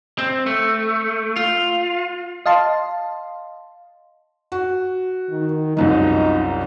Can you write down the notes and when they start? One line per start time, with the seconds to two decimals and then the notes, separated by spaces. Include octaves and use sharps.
0.19 C4
0.46 A3
1.36 F4
2.46 D#5 F5 A5 C6
4.52 F#4
5.30 D#3
5.77 C2 F#2 F3 D#4